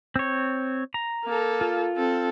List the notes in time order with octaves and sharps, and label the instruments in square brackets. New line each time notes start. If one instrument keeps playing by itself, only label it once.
[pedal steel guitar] C4 C#5
A#5
[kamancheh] A#3 A4
[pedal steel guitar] F4
[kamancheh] C4 A4